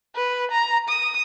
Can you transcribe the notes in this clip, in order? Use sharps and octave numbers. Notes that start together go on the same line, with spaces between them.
B4
A#5
D#6